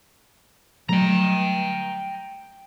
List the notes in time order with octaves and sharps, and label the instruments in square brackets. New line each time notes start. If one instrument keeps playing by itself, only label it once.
[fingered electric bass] F#3 G3 A3 [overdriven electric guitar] G5 A#5